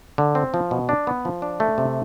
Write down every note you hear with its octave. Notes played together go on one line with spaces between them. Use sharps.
D3
C4
F3
B2
D4
B3
F3
D4
A3
C3